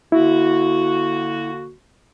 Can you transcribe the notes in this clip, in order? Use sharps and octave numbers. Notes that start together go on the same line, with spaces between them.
D3 A#3 E4 F#4